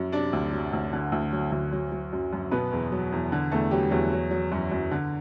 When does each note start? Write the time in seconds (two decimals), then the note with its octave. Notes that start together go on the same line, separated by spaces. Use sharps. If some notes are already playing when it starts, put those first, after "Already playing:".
Already playing: F#2
0.12 C3 D4 D5
0.33 D2
0.53 F#3
0.73 D2
0.93 D3
1.12 D2
1.32 F#3
1.52 D2
1.73 F#3
1.92 F#3
2.13 F#2
2.33 F#2
2.51 B2 B3 B4
2.72 E2
2.92 F#3
3.12 E2
3.32 D3
3.51 E2 A3 A4
3.71 F#3 G3 G4
3.91 E2 F#3 F#4
4.12 F#3
4.31 F#3
4.52 F#2
4.72 F#2
4.91 D3